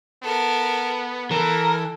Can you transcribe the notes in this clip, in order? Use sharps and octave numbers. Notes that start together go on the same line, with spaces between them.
B3 A4 A#4
E3 A4 A#4